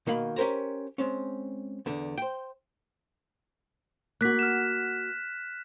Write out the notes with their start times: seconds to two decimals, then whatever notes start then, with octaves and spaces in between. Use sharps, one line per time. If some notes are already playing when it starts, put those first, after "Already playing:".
0.07 B2 D#3 A#3 F5 B5
0.36 C#4 G4 A#4 C5 A#5
0.98 G#3 C4 C#4
1.86 E2 D3
2.18 C5 G5
4.21 A#3 F#4 F#6 B6
4.39 F6 E7